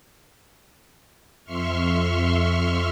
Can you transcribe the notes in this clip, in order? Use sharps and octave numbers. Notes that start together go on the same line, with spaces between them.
F2 E5 C6 C#6 F6